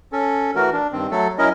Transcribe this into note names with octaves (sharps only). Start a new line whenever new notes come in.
C#4 A4
E3 A3 F#4 A#4
D4
G2 D#3 C4
F#3 A3 A4
F#3 C#4 E4 A#4 D#5